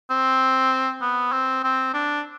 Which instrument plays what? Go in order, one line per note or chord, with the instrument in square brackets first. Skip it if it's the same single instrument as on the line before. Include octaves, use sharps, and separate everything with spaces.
[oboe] C4
B3
C4
C4
D4